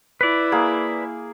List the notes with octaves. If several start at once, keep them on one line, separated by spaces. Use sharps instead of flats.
E4 B4 D5
A#3 G#4